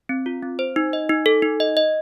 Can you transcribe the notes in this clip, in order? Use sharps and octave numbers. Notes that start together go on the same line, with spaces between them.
C4
F4
C4
C5
D#4
D#5
D#4
A4
D#4
D#5
D#5